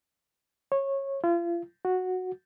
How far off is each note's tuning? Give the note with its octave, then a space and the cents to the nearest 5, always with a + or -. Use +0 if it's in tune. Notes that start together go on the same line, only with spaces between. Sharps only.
C#5 -20
F4 -35
F#4 -5